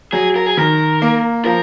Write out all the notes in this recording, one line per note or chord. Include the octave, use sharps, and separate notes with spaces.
F#3 G#4
A#4
G#4
D#3 A#4
A#3
F3 A#4